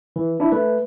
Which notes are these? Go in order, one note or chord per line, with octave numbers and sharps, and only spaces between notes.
E3
D4 E4
A3 B4